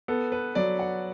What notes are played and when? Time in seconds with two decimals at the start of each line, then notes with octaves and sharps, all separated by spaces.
0.08 B3 A4
0.32 B4
0.55 F#3 D5
0.79 F#5